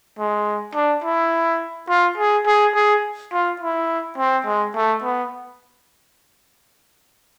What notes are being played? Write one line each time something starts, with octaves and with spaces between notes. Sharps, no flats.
G#3
D4
E4
F4
G#4
G#4
G#4
F4
E4
C4
G#3
A3
B3